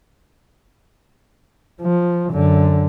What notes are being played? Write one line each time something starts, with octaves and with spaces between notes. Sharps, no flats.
F3
F#2 D3